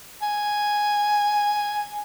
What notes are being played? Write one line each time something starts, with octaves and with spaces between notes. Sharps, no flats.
G#5